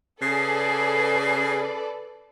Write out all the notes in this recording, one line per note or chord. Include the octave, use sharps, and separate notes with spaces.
C#3 G#4 A4 B4 D5 C7